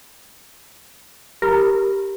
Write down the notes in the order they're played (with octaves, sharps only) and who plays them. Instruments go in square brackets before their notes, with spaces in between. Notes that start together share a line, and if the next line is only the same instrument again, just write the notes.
[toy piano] G4 B5 [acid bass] A#4